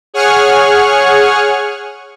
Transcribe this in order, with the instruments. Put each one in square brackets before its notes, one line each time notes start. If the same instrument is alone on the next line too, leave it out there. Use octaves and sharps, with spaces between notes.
[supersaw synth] G#4 C#5 F#5 G#5 C#6 F6